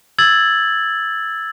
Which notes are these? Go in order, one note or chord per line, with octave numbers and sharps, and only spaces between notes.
E6 G#6 A6 F#7